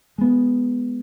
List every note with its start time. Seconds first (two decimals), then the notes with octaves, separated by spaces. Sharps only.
0.18 G#3 B3